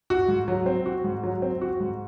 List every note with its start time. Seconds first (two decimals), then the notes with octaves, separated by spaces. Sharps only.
0.10 F#4
0.28 G#2
0.48 F#3
0.66 C4
0.86 F#4
1.04 G#2
1.24 F#3
1.42 C4
1.61 F#4
1.80 G#2